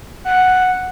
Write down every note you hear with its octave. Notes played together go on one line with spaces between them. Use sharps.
F#5